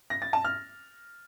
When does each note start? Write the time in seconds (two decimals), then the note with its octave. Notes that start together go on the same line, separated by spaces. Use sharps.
0.10 A#6
0.22 A6
0.33 A5
0.45 F6